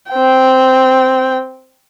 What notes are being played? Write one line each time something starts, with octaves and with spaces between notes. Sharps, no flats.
C4 G5